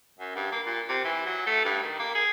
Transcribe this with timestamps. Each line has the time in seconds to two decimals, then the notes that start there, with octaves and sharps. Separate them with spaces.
0.19 F#2
0.36 G2
0.52 A#3
0.66 A#2
0.89 C3
1.04 E3
1.26 F#3
1.47 A3
1.65 G2
1.82 D#3
1.99 A#3
2.15 G#4